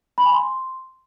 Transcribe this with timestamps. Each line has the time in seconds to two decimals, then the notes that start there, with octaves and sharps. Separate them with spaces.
0.18 B5
0.26 G#5
0.34 C6